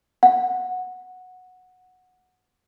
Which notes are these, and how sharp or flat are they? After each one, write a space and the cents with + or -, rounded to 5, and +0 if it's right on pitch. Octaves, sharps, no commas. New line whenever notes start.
F#5 -10